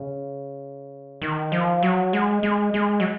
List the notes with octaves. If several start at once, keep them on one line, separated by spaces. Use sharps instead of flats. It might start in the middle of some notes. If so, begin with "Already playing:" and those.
Already playing: C#3
D#3
F3
F#3
G#3
G#3
G#3
F#3